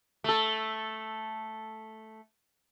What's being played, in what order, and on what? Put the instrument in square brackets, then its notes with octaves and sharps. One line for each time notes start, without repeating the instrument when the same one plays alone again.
[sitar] A3 A4